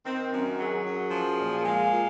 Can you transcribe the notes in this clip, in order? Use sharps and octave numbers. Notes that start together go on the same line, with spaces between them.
D#3 C4
F#2 F#4
F#3 G#4
F#2
F3
A#2
G#3 F5
A#2